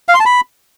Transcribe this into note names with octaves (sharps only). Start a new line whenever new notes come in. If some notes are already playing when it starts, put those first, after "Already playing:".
F5
C6
A5
B5